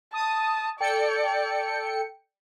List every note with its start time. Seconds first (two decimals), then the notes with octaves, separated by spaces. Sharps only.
0.14 A5 D#6
0.80 A4 D5 G5 C#7